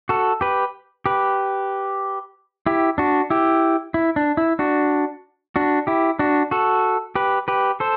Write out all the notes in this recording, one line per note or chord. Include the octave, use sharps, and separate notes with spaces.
F#4 A4
G4 B4
G4 B4
E4 G4
D4 F#4
E4 G4
E4
D4
E4
D4 F#4
D4 F#4
E4 G4
D4 F#4
F#4 A4
G4 B4
G4 B4
A4 C5